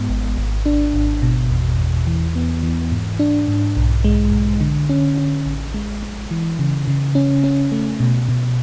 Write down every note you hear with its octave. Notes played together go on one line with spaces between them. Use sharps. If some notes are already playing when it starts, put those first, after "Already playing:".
Already playing: G#2 G#3 B3
G#1
G#1
D4
G#1
B2
E2
E2
E3
B3
E3
G#2
D4
G#2
B1
G#3
B1
D3
C#4
C#4
A1
G#3
G#3
E3
C#3
C#3
C#4
C#4
A3
B2
B2